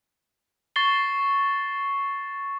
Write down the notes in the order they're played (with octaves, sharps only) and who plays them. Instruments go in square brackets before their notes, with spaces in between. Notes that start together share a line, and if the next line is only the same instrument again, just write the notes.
[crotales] C#6 A6 C7 G7